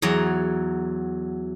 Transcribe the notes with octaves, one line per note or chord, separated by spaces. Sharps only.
E2 F#3 A#5